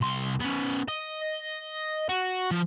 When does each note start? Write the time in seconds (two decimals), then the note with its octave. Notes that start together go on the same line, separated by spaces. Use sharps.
0.01 C2 C6
0.40 B3 C#4
0.88 D#5
2.09 F#4
2.51 F3